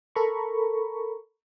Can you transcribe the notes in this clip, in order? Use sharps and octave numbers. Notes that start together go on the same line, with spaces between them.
A4 A#4 A#5 B5 C#6